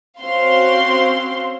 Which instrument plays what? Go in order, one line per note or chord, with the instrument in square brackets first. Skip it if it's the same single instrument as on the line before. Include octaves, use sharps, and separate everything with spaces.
[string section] C4 C#4 F#4 C5 F5 C6